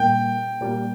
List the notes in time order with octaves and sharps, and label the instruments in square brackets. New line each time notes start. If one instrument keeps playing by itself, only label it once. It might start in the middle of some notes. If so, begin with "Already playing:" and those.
Already playing: [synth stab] A#2 G3 A#3 [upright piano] G5
[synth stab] A#2 G3 A#3